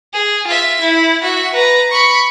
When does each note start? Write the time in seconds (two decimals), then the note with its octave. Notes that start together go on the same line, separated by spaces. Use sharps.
0.14 G#4
0.47 F4 E5
0.81 E4
1.22 F#4 E5
1.53 B4 A#5
1.91 B5 C#6